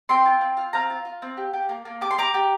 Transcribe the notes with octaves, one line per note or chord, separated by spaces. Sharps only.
C4 G5 C6
F4
C4
F4
C4 F5 A#5
F4
F4
C4
G4
G4
A#3
A#3
G4 D6
C6
G4 A#5 D6
G4